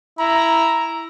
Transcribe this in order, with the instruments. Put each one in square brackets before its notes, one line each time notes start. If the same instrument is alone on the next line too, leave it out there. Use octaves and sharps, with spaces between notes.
[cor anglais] E4 [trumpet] A#5